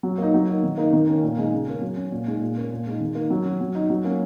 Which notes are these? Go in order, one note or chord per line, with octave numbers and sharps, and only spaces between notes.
F#3
A#3 D#4
F#3
A#3 D#4
D#3
A#3 D#4
D#3
A#3 C#4
A#2
G#3 D#4
C#3
A#3 C#4
F#3
C#4
A#2
G#3 D#4
A#2
A#3 C#4
A#2
G#3 D#4
D#3
A#3 D#4
F#3
C#4
F#3
D#4
F#3
A#3 C#4